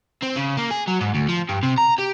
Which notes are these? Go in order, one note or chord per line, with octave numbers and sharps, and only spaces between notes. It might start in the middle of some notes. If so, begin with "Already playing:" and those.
C4
C#3
A#3
G#4
F#3
G#2
D2
F3
G2
C3
A#5
G4